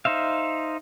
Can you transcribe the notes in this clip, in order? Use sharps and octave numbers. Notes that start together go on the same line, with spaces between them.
D#4 C5 E5 F5